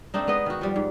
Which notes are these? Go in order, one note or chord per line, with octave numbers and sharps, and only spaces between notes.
A3 C4 D4 D#4
G#3 B3 B4 D#5
D#3 F#4
F3 G3
G#2